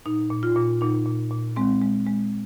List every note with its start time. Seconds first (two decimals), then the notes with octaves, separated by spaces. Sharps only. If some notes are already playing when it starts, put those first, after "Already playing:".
0.06 A#2 D#4
0.31 A#2
0.43 F4
0.56 A#2
0.81 A#2 D#4
1.06 A#2
1.31 A#2
1.56 G#3 C4
1.81 G#3
2.07 G#3